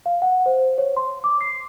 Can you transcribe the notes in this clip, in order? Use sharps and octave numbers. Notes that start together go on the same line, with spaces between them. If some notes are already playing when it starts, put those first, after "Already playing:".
F5
F#5
C5
C#5
C6
D6
C7